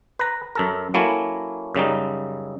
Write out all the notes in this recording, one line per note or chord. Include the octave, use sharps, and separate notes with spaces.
B4 A#5
F#2 A4 A#4
F#3 A#3 C#4 E4 A4
F#2 C#3 G3 D#4